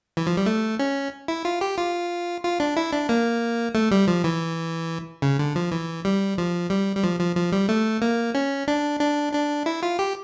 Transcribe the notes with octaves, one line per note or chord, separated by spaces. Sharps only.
E3
F3
G3
A3
C#4
E4
F4
G4
F4
F4
D4
E4
D4
A#3
A3
G3
F3
E3
C#3
D3
F3
E3
G3
F3
G3
G3
F3
F3
F3
G3
A3
A#3
C#4
D4
D4
D4
E4
F4
G4